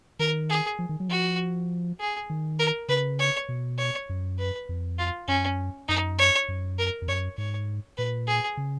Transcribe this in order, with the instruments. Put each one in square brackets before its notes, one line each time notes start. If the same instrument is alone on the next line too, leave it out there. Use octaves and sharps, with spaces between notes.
[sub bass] D#3 [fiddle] A#4
[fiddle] G#4
[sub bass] F3
D#3
F#3
[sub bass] F3 [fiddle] F#4
[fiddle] G#4
[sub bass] D#3
[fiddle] A#4
[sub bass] C#3 [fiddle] B4
[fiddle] C#5
[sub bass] B2
[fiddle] C#5
[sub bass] F#2
[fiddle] B4
[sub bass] F2
[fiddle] F4
[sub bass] F#2 [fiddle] C#4
[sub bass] F#2 [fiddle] D#4
[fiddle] C#5
[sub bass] F#2
[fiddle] A#4
[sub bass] F2
[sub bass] F#2 [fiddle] C#5
[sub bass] G#2 [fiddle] C#5
[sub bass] A#2 [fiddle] B4
[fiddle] G#4
[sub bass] C#3